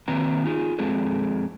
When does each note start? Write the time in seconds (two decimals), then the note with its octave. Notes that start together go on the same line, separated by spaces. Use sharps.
0.08 D#3 F#3 A#3 C4 B4 A#5
0.44 D#4 F4 G#4
0.79 F2 G#3 C4 G#4 A4